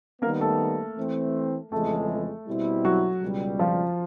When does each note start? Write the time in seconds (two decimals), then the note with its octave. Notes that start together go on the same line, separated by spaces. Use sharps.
0.22 D#3 G3 A#3 B3 A#4
0.40 A3 A4
0.97 E3 A3 C4
1.72 F2 C#3 E3 G#3 A3 A4
2.47 B2 G3 C4 E4
2.85 F#3 F#4
3.23 C#2 B2 G3
3.59 F3 F4